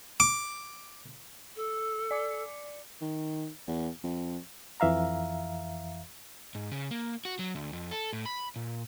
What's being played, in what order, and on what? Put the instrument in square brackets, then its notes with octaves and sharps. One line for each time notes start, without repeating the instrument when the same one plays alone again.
[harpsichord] D6
[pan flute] A4
[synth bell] D5 D6 C#7
[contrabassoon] D#3
E2
F2
[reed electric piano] F2 E3 E5 F5 A#5
[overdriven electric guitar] G#2
C#3
A#3
F#4
F#3
D2
F2
A4
A2
B5
A#2